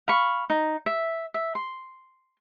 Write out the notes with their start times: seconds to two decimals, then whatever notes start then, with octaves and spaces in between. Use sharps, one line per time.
0.08 F5 B5 C#6
0.50 D#4
0.86 E5
1.34 E5
1.55 C6